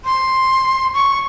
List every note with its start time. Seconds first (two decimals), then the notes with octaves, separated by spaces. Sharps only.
0.05 C6
0.94 C#6